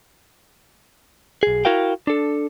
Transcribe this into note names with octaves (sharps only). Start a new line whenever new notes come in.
B1 G#4
E4 F#4 A#4 F5 G5
D4 A4